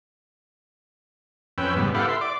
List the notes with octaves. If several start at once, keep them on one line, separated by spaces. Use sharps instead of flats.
F2 C#4 B4 G5 E6
G#2 C#3 G3 B3
E4 G4 A4 B4 F5 F#5
E5 C6
D5 D6